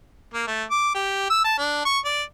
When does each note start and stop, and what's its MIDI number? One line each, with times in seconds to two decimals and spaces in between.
0.34 0.46 58
0.47 0.64 57
0.71 0.91 86
0.95 1.29 67
1.30 1.41 88
1.44 1.57 81
1.58 1.85 62
1.85 1.99 85
2.05 2.23 74